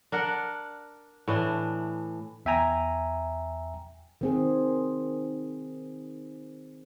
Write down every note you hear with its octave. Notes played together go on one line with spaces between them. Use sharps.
D4 A#4 F#5
A2 E3 D4
E2 E5 G5 G#5 A#5
D#3 C4 G#4